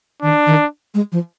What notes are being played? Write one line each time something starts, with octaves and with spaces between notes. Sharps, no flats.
D#3 D4
D#3
G#3
F3